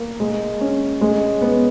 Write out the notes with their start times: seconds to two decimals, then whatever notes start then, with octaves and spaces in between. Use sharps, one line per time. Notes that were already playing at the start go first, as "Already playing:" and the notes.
Already playing: A#3
0.20 G#3
0.61 C#4
1.01 G#3
1.41 B3